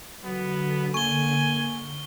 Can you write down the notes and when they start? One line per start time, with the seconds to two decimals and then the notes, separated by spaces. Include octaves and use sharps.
0.24 D3 F#3 B3
0.94 A#3 G#5 C#6 G7